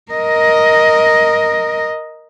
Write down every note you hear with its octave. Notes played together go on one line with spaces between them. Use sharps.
A#4 D#5